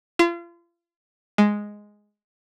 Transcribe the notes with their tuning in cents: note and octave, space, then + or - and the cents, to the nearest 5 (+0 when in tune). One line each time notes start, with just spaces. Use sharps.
F4 -35
G#3 +0